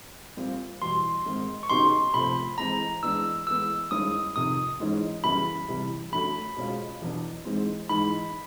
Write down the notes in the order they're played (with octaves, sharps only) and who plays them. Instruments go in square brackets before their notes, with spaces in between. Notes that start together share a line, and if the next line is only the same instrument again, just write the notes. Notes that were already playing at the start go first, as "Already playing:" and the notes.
[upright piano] A#2 G3 C4 F4
[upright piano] E2 B2 G3 [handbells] C6
[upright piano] G#2 D#3 G#3 C4
[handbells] C#6
[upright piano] C#3 F#3 B3 D#4 G4 [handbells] C6
[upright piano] C3 F3 A3 C4 [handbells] B5
[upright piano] E3 G#3 C4 [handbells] A#5
[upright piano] E3 G#3 B3 D4 [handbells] E6
[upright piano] A2 E3 G#3 B3 [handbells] E6
[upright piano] G2 D#3 G#3 C#4 E4 [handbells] D#6
[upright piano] F2 C3 D#3 [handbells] D#6
[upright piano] G#2 E3 G#3 C#4
[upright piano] F#2 C#3 E3 G3 B3 [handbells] B5
[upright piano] C3 E3 G3
[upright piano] F#2 D3 F#3 A3 [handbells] B5
[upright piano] B2 G#3 C#4 F4
E2 B2 F#3 B3 D4
G#2 E3 G#3 C4
[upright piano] G#2 E3 G#3 [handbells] B5